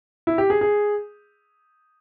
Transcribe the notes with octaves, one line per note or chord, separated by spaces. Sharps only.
E4
G4
G#4
G#4